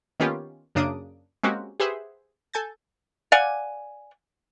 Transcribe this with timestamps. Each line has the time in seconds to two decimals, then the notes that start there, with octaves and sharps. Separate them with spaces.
0.20 D#3 A#3 B3 C#4 F4 G4
0.75 F#2 C#3 A#3 D4 D#6 D7
1.43 G#3 A#3 C4 C#4 F#4 G4
1.80 G4 G#4 B4 C5 E5 F#5
2.54 A4 G#5 G6 A6
3.32 D5 F5 F#5 G#5